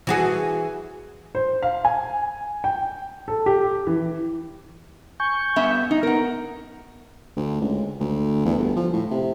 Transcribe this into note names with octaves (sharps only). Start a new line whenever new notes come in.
E3 F#4 G#4
C5
F5
G#5
G5
A4
G4
E3
G#5 C#6 G6
G2 B3 E5
D#4
B3 A#4 F#5
D2
C#2
D2
E2
G1
F3
A2
C3